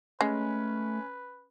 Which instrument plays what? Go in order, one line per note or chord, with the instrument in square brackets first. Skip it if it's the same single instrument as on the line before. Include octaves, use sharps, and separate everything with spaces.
[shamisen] G#3 [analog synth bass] A3 [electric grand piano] C#4 [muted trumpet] B4